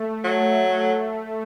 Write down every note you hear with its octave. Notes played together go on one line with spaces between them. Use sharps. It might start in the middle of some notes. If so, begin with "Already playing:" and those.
Already playing: A3
F#3
A3